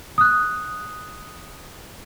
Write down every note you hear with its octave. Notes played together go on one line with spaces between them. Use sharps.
D#6 F#6